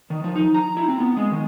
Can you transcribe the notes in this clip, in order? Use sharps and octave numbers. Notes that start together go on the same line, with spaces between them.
D#3
F3
D#4
A#5
E4
C4
B3
G#3
D#3